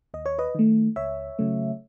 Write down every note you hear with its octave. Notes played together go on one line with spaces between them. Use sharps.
D#2 D#5
C#5
B4 D#5
D#3 A3
C#2 C#5 E5
C#3 F#3 A3